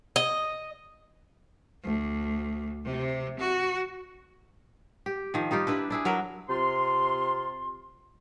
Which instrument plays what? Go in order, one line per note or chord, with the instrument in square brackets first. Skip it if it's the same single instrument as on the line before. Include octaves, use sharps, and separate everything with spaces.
[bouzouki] D#5
[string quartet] D2
C3
F#4
[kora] G4
D#3 F3
G3 D#4 F4 G4
D4 E4 B4
D4 E4 G#4
F#3 A#4 B4
[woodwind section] C3 F4 C6